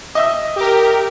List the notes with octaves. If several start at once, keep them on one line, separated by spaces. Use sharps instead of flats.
D#5 E5 E6
G4 A#4